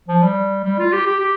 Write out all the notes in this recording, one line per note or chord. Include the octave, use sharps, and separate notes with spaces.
F3
G3
G3
F4
G4
G4
G4